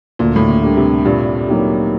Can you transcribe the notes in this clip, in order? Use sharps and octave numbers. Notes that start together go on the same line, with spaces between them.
D2 A#2
A2
A#2
D3 G3 A#3
C3
G2 A#2
F#3 A#3 D#4 G4